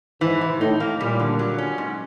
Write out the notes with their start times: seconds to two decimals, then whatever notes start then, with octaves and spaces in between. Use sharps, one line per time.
0.21 G#2 E3
0.41 C3
0.60 A2 D#4
0.80 A#3
1.00 A#2 G3
1.20 D3
1.39 F#3
1.58 C#4
1.78 G#2